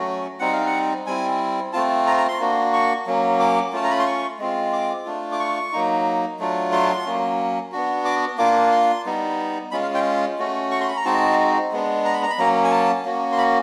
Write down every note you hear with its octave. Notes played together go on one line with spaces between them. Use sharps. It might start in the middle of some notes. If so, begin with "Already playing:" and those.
Already playing: F#3 A3 C#4 F#4
G3 C4 D#4 F#5
F5
F#5
G3 C4 E4 G#5
A3 C4 F4 A5
A#5
A#5
C6
A#3 D4 F#4
C#6
F#3 A#3 C#4
D6
A3 C#4 F4 A5
A#5
B5
C6
C#6
G#3 C4 F4
D6
A3 D4 F4
D6
C#6
F#3 A#3 D#4
F#3 A3 D4 F4
C6
F#3 A#3 C#4
B3 D4 F#4
D6
A#3 D4 F4 D6
C6
G3 B3 D#4
G#3 C#4 F4 B5
F5
G5
A3 C#4 F#4
C#6
C6
B5
A#5
G#3 C4 D#4 F#4 A5
G#3 B3 D4
A#5
B5
A#5
B5
F#3 A#3 C#4 A#5
G#5
A5
A#3 C#4 F#4
C6
B5